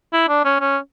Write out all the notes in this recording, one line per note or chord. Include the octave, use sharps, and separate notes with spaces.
E4
D4
C#4
C#4